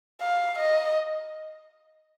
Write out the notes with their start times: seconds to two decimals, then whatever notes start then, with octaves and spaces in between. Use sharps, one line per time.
0.21 F5
0.59 D#5